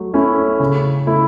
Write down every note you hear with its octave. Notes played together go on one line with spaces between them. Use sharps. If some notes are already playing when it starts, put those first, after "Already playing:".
Already playing: F#3 A3
A3 C#4 E4
C#3
A3 E4